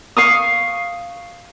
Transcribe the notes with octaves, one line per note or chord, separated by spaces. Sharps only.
F5 C#6 D#6